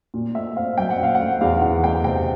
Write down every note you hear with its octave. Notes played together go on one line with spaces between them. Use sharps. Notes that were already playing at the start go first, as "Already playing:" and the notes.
A#2
A3 E5
C4 F5
F#3 G5
F#5
A#2 F5
F#5
A3
E2 F5
E3 F#5
A3 G5
C3 G5